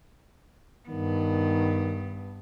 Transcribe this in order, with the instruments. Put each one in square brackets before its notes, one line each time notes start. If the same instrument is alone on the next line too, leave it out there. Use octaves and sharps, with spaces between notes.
[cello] G2 B3 [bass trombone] D#3